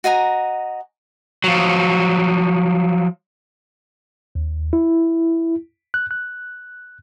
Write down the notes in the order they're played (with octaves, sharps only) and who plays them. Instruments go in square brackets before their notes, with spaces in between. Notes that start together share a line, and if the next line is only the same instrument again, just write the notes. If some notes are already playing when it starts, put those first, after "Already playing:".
[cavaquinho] F#4 D#5 G#5 A#5
[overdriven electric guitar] F3 F#3
[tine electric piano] D#2
E4
F#6
F#6